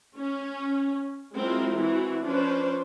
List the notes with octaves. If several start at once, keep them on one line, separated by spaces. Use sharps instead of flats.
C#4
F#3 G#3 C4 E4 F4 A#4
E3 C4 E4 F#4
F3 C#4 D4 B4 C5